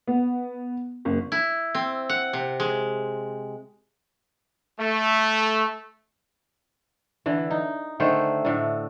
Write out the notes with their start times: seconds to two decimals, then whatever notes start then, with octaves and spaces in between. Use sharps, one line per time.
0.07 B3
1.05 F#1
1.32 E4
1.75 C4
2.09 F#5
2.33 C3
2.60 G#3
4.80 A3
7.26 D3 E3
7.51 D#4
8.00 D3 D#3 A3 C5
8.45 A2 D3